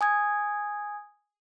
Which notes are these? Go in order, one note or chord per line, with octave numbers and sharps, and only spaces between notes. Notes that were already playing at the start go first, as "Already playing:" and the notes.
G#5 D#6 G#6